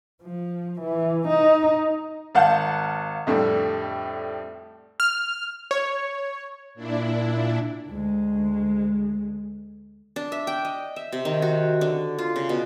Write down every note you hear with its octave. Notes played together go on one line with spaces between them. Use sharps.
F3
E3
D#4
G#1 F5 F#5 A5 G6
F2 A2 D3 G3
F6
C#5
A#2 D4 E4
D2 G#3
D4
E5
G5
D#5
E5
C3
D#3
F#4
D3
F4
C#3
B2